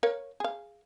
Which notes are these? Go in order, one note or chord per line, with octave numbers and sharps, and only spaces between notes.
A#4 C#5 F5
G#4 F5